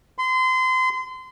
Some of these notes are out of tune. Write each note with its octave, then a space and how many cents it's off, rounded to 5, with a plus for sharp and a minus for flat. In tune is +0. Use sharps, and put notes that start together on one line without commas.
C6 -30